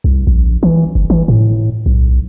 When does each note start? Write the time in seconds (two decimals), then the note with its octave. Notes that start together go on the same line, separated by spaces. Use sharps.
0.04 C2
0.27 A#1
0.63 E3
0.95 G1
1.10 E3
1.28 A2
1.86 B1